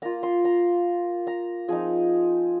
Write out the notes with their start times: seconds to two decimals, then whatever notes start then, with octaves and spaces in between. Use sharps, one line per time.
0.02 A#3 F4 A#5
0.23 C6
0.45 A#5
1.27 A#5
1.68 F3 C4 D#4 G#4